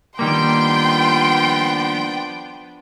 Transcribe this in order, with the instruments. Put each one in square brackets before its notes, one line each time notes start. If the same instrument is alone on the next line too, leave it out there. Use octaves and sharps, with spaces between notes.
[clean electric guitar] D#3 G3 A#3 [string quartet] F3 B3 D4 [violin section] G5 [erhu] C6